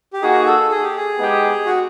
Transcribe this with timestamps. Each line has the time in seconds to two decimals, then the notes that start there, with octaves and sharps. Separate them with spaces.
0.13 G4
0.22 A#3 D#4 F#4 G#4
0.46 A4
0.71 G#4
0.83 G4
0.97 G#4
1.19 G#3 B3 D#4 G4
1.66 F#4